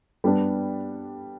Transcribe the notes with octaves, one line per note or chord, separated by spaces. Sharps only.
G3 B3 D4